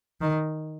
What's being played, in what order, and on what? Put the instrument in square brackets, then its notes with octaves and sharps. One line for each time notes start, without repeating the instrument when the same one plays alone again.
[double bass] D#3